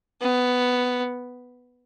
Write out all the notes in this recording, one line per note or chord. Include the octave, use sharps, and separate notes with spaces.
B3